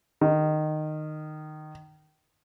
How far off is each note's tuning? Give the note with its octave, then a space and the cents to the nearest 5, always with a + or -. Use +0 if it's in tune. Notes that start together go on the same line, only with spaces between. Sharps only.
D#3 -15